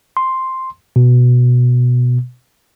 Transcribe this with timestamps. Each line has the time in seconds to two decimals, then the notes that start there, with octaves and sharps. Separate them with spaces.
0.17 C6
0.96 B2